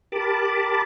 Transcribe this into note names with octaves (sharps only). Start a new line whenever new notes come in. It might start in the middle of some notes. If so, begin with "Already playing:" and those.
G4 A#4 A5 B5 D6